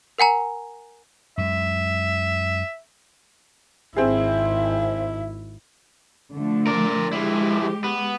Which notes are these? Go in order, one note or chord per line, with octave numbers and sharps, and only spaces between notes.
A#4 F#5 G#5 A#5
F#2 G#3 E5
G#1 C4 E4 G#4 E5
D3 F3 A3
A#4 D5
F3 G#3 E4 G4
B3